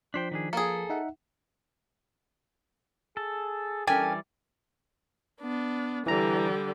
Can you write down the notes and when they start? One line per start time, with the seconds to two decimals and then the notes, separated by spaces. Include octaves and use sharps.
0.14 F3 D4 C5 G5 B6
0.31 D#3 D4 G#4
0.53 A#3 G#4 A4
0.90 D#4 E5 F#5
3.17 G#4 A4
3.87 E3 G3 C#4 A4 A#4 D5 G5 G#5
5.41 B3 D4
6.06 D3 E3 G3 A#5